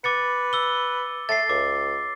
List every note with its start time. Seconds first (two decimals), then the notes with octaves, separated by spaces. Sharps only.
0.04 B4 D6 A6 C#7
0.53 E6 G7
1.29 A3 A6 C7
1.49 C#2 D6